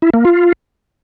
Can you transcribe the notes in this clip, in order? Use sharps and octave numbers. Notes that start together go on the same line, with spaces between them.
E4
A#3
F4